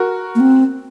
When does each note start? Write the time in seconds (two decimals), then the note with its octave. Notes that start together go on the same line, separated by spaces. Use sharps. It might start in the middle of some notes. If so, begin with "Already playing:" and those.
Already playing: F#4 A#4
0.35 A#3
0.40 C4